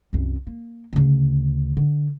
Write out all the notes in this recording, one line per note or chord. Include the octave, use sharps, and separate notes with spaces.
C2 F#2
A#3
D2 C#3
D3